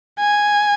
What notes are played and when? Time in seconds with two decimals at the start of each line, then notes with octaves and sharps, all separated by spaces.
0.20 G#5